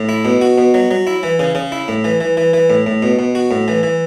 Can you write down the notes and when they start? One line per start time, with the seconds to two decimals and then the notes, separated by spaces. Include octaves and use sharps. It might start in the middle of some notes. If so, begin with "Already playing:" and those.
Already playing: A2
0.09 E4
0.25 B2
0.41 F#4
0.58 B2
0.74 F#3
0.91 F#3
1.07 E4
1.23 E3
1.39 C#3
1.55 C#3
1.72 E4
1.88 A2
2.04 E3
2.20 E3
2.37 E3
2.53 E3
2.70 A2
2.87 A2
3.02 B2
3.19 B2
3.35 F#4
3.51 A2
3.68 E3
3.83 E3